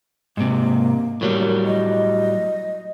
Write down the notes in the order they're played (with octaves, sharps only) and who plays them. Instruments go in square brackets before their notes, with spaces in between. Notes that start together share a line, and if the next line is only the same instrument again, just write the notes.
[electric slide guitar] G#2 C3 [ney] A#3
[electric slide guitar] A2 F#3 G3 [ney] A#4
[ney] D#5